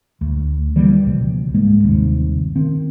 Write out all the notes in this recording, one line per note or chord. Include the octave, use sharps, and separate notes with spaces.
D2
D3 E3 G3 A#3
C#2 B2 F3
G#2 G#3 A#3
G1 D#2 C3
D#3 C4